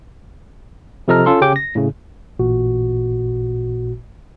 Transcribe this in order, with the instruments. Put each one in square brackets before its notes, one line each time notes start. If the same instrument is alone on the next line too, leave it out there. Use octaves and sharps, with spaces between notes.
[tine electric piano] C3 F3 A4 D#5 A#5 F6
C#4 F4 A4 C6
C#3 C#4 G4 G5 D6
A#6
A2 C#3
A1 A#2 F#4